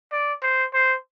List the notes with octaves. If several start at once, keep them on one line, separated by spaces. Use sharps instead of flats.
D5
C5
C5